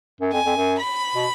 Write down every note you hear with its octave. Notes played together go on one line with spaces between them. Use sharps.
F#2
F2 G#5
F2
F#2
B5
B2